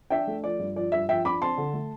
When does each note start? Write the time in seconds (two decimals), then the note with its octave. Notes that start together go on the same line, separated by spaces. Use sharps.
0.10 D4 E5 G5
0.27 A3
0.44 F3 D5
0.59 G2
0.76 F3 D5
0.92 G2 E5
1.09 F3 E5 G5
1.25 D4 B5 D6
1.41 C4 A5 C6
1.58 D3
1.73 A3